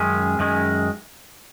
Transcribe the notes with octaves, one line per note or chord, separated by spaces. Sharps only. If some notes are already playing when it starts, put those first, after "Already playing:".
Already playing: F#2 D#3 G#3 C#4
F#2 D#3 G#3 C#4